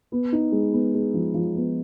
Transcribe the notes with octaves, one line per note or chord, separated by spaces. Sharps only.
B3
D#4
G#3
B3
G#3
F3
F3
B3